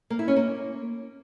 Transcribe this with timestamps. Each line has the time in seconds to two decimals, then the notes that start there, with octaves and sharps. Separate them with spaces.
0.10 A#3
0.19 E4
0.28 C#4
0.36 A#3